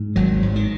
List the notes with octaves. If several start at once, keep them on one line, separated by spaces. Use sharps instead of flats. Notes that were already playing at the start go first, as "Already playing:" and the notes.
Already playing: G#2
G#1 F#3
G#2
D#3